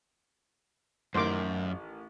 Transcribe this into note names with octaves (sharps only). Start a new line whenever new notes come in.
A1 F#2 D#3 C5 D6